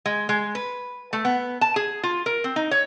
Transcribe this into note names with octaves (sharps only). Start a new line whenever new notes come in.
G#3
G#3
B4
A3
B3
A5
G#4
F4
A#4
C4
D#4
C#5